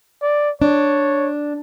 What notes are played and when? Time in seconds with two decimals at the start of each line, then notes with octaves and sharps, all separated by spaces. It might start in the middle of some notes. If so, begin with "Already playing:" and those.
0.22 D5
0.62 D4 C#5